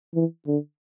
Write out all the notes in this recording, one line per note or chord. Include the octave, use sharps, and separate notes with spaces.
E3
D3